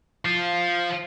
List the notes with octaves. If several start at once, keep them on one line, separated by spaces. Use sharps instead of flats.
F3 F4